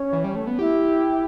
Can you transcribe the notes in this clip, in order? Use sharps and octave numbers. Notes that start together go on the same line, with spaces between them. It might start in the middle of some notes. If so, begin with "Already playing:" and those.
Already playing: C#4
E3
G3
A3
B3
E4 G4